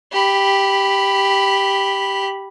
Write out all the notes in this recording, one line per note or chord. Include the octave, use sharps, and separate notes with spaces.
G4 B5